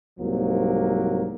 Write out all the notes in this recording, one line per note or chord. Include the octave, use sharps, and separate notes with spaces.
C2 G#2 F#3 A#3